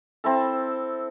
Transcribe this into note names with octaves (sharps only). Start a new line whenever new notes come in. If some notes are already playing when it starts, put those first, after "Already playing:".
C4 E4 A4